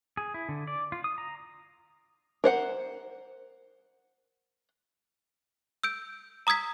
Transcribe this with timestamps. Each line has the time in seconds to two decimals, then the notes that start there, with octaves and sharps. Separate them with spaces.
0.17 G#4
0.34 E4
0.49 D3
0.67 D5
0.92 F4
1.04 D#6
1.18 A#5
2.44 A#4 C5 F#5
5.84 E6 G6 D7
6.47 A#5 D#6 E6 G#6 B6